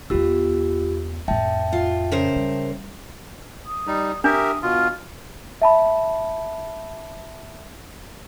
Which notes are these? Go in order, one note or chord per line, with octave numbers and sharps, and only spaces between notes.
E2 B3 F4 G4 E6
F2 A2 E5 G5 A5
F4
C#3 A#4 C5
G3
D#6
G3 D#4
D4 G4 A#4 E5 D#6
B2 F4 F6
E5 A5 B5